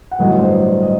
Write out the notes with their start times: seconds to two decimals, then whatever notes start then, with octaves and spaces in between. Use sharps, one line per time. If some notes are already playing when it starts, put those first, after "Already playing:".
0.11 F#5
0.19 A1 G2 D3 F#3 D#5
0.39 C5
0.50 D5
0.82 D#5